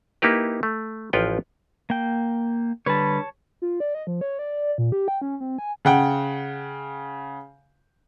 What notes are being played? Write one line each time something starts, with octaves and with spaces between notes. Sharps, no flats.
A#3 D#4 E4 G4 B4
A3
A1 F3 F4 B4 C#5 G5
A#3 G5
D3 G3 B4 C#5 A5
F4
D5
D#5
F3
C#5
D5
A#2
G4
G5
C#4
C4
G#5
C#3 F#5 G5